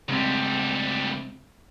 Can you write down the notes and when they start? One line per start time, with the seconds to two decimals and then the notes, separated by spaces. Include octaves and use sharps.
0.08 D2 C#3 G3 G#3 C4